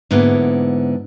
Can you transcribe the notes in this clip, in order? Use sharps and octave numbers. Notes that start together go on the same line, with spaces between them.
G#2 D3 A#3 B3 E4